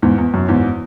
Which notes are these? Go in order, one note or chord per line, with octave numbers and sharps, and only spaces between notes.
E2 G#2
E2
F#2
E2 G#2